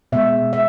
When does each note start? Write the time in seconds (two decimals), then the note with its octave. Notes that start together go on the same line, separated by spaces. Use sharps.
0.12 B2 G#3 E5
0.53 E5